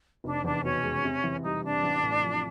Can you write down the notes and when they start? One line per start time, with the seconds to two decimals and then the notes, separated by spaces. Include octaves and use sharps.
0.24 F1 D4
0.44 E2 D4
0.64 B2 C#4
0.83 G#3
1.04 C3
1.24 E3
1.43 G3 D#4
1.64 C3 D4
1.83 A1
2.03 A2
2.22 F3